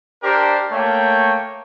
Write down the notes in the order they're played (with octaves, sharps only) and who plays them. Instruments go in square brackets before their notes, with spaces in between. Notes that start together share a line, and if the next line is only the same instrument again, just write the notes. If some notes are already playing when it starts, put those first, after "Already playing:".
[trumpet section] D4 G4 A#4 C5 D5
A3 A#3 C#5 G5